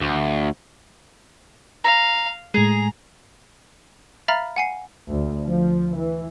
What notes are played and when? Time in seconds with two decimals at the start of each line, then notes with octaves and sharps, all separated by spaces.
0.02 D2
1.84 F5 A#5
2.54 A2 G#3 G#4 A#5
4.28 E5 F5 A#5 B5 F6 A6
4.56 F#5 G#5 C7
5.09 D2
5.45 F3
5.95 E3